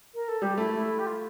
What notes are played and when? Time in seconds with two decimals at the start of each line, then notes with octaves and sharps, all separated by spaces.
0.14 A#4
0.28 A4
0.42 G3 G4
0.58 A3 E4
0.75 E4
0.98 G4
1.06 F4